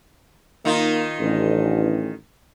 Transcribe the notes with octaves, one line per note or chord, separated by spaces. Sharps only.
D#3 A#3 D#4 F4
A1 D4